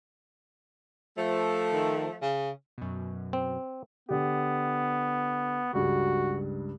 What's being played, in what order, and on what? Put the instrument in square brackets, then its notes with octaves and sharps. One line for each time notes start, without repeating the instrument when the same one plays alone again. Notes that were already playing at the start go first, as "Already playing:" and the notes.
[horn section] F3 A3
[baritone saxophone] D#3
C#3
[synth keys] F#2 B2
[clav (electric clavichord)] C4
[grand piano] D3 G4 [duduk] B3
[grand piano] C#2 G2 [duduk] F#4